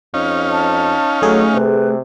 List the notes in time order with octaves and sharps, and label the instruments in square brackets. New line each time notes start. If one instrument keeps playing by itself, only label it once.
[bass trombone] F2 [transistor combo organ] C#4 D#4 F5
[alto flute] A5
[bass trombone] F#3 [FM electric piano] A3 G#4 [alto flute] A4
[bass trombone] C3 [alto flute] B4